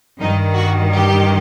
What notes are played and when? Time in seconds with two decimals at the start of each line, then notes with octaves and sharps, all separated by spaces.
0.19 G2 D#3 D#4
0.56 F#4
0.95 G4